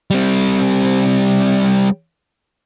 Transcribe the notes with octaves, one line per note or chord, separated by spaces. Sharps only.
G3 C4